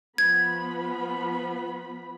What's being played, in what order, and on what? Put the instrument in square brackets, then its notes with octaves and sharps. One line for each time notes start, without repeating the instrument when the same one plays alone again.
[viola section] F3 B3 B5 [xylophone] G#6